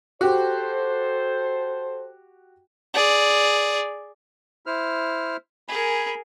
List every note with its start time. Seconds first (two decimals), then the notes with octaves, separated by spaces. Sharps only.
0.21 F#4 G4 A4 C5
2.94 G#4 D5
4.66 E4 C5 F6
5.68 G#4 A#4 G#5 B5